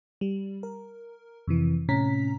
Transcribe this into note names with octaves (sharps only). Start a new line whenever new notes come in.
G3
A#4
F2 C3 E3
A2 C3 C#4 A#5 B6